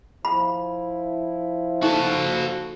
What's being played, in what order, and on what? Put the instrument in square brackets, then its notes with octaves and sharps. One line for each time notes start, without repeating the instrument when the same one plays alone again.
[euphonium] F3 [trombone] E4 [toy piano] B5
[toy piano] D#4 [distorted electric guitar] F#4 A5 [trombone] A4